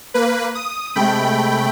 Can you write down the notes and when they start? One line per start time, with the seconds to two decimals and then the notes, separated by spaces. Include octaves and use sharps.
0.14 A#3 B4
0.55 D#6
0.95 C3 G#3 A3 G5 B5